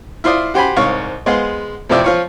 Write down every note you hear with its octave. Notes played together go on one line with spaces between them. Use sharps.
E4 F4 C5 D5 D#6
F#4 G4 C5 G#5 B5
C2 G#2 C#5 F5 C#6
G#3 B3 G#4 C5 F5
F2 A2 C3 F3 D5 E5
F3 F4 C#5